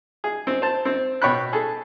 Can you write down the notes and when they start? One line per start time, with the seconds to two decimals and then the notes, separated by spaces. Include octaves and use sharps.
0.24 G#4
0.47 C4
0.62 C5 A5
0.85 C4
1.22 B2 C#5 G5 B5 F#6
1.53 G#4 A4